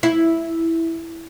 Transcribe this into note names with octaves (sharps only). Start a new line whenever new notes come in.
E4